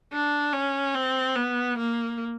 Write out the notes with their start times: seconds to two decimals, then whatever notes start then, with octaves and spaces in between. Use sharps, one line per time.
0.12 D4
0.53 C#4
0.95 C4
1.36 B3
1.78 A#3